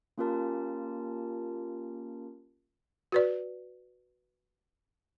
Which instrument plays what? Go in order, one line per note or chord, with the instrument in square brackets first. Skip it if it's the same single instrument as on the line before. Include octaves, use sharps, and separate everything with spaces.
[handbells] A#3 C#4 F4 G4 A#4 A5
[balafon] F#4 B4 D5